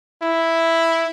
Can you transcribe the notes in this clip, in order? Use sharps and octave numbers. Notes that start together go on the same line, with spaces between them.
E4